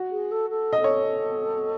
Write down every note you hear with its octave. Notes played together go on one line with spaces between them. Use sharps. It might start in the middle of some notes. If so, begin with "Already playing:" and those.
Already playing: F#4
G#4
A4
A4
D#5
A4
C#5